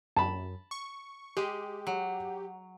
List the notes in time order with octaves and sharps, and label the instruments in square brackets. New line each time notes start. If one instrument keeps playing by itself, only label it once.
[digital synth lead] F#2 [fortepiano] A5 B5
[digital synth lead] C#6
[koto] G#3 [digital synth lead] G4
[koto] F#3